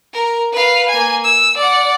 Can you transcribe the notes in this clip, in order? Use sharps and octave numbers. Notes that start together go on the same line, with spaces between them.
A#4
B4 F5
A#3 G#5
E6
D5 F#5